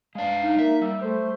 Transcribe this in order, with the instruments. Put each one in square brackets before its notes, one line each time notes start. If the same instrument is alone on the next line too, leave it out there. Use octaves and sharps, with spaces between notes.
[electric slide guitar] G#3 D4 [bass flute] F5
[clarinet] D#4
[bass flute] A#3 [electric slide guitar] E5
[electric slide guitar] G3 [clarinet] E5
[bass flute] A3 [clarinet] C5